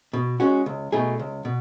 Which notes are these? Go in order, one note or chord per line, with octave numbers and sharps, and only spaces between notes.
B2
G#3 C#4 F#4
C#2
B2 A3 D#4 G#4
C#2
B2